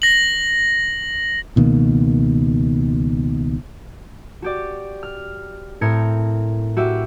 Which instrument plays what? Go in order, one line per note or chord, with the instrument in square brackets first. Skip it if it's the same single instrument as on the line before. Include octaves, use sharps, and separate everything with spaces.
[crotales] A#6 F#7
[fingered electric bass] C#2 B2 D#3 A#3
[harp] F#4 G4 D5
F6
A2 C4 A#4 G#6 C#7
E4 F#4 G4 E5